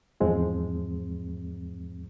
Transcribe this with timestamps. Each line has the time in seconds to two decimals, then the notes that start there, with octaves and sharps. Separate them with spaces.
0.20 E2 G#2 F3 G#3 C4